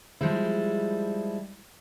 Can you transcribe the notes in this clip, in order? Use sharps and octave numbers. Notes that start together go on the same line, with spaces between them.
F3 G3 G#3 E4